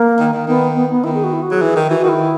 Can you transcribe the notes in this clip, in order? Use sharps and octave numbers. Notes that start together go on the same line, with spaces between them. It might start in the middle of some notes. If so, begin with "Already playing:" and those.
Already playing: A#3
D#3
D#3
D#3 B3
B3
B3
D#3 E4
G#4
F#4
E4
F#4
F#3 G#4
E3
D#3
E3 F#4
F#4
D#3 E4